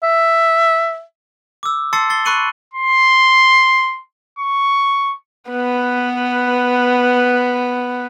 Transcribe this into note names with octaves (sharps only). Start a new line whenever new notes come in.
E5
D6 E6
A5 C6 E6 A6 C7 C#7
A6 C7 G7
B5 C#6 F#6 C#7 D#7 F#7
C6
C#6
B3 B4